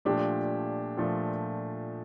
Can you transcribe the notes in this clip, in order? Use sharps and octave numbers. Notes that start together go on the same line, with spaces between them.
A#2 F3 A3 D4 G4
A#2 F3 A3 D4